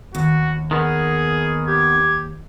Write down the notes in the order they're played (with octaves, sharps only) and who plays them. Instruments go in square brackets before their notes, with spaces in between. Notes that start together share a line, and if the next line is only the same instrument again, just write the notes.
[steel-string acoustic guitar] D#2 [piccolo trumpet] F#4
[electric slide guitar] D#3 B3 [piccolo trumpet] G#4
[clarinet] G4 [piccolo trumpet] G#6